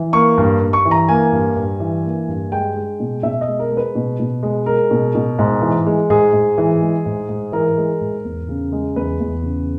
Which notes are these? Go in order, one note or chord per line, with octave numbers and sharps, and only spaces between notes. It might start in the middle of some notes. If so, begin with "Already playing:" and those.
Already playing: E3
A#3 C#6
G2
G2
C#6
E3
A#5
A#3 G#5
G2
G2
E3
A#3
G2
G#3 G5
G#3
B2
B2 E5
D#5
G#3
A#4
G#3
B4
B2
B2
G#3
G#3 A#4
B2
B2
G#2
E3
G#3
G#2 G#4
G#2
E3
G#3
G#2
G#2
E3 A#4
G#3
G#2
E2
C#3
G#3
E2 B4
E2
C#3